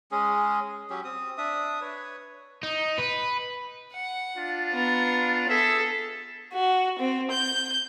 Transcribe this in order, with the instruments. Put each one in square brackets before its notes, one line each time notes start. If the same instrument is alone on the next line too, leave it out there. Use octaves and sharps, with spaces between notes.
[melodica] G#3 C#4 G#4
F#3 C#4 G4
C4 D#6
D4 E5 D#6
B4 C#5
[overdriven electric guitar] D#4
B4
[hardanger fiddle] F#5
[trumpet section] D4 F4
[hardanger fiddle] B3 A#5
[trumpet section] G#4 E5 [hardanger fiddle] A4
[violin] F#4
C4
G6